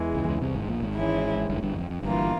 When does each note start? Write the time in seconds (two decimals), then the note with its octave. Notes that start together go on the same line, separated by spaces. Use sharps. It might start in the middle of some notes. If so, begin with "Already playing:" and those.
Already playing: E2 E3 G#3
0.15 C#2 C#3
0.28 C#2 C#3
0.41 C2 C3
0.55 G#1 G#2
0.68 A#1 A#2
0.82 G#1 G#2
0.95 E3 G#3 C#4 E4
1.49 G1 G2
1.58 G#2
1.62 G1 G2
1.76 F2
1.90 F2
2.03 G1 G2 E3 A#3 F4